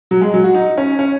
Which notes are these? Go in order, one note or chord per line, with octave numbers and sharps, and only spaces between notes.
F#3
G#3
F#3
F#4
D#4
C#4
C#4